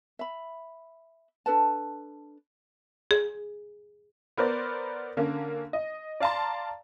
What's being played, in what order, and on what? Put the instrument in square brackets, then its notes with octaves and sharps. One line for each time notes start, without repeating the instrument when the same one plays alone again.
[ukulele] E5 B5
D4 A4 B4 A5
[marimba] G#4
[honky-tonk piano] B3 A#4 C5 D5
D3 A#3 C#4
D#5
D5 F5 A5 A#5 C6